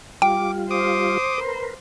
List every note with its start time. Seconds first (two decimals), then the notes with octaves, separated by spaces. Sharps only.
0.22 G3 F4 G5 D6
0.71 C5 D6 D#6
1.38 A#4 B4